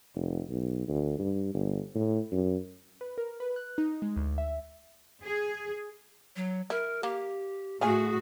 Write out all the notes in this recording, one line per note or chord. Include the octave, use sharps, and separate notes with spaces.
F1
B1
D2
G2
G1
A2
F#2
B4
A#4
B4
F#6
D#4
G#3
D2
E5
G#4
F#3
E4 A#4
A#3 G4
A2 A3 F4 F#4 G#4 G#5